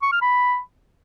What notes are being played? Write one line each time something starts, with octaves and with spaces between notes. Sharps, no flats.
C#6
F6
B5